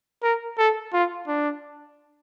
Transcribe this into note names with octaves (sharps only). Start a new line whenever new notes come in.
A#4
A4
F4
D4